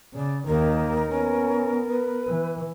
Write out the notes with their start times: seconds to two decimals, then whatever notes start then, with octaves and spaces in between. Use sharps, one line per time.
0.14 C#3 D5
0.47 D#2 D#3 A#3 A#4
1.09 B3 C#4
1.89 B4
2.28 E3